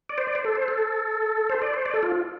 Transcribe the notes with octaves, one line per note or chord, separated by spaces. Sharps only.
D5
C5
D5
C5
A4
C5
A4
C5
D5
C5
D5
A4
F4